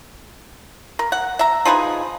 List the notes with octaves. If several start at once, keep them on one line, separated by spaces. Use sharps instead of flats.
A#4
F#5
E5 A#5
F3 D#4 G#4 B4